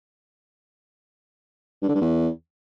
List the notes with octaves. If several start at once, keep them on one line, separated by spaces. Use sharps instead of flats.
G2
D3
G2
E2